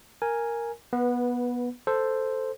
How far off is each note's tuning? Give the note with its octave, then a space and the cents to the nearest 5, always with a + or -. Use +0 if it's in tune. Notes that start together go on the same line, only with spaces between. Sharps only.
A#4 +0 G#5 +0
B3 -20 B4 +0
A4 +5 C5 +0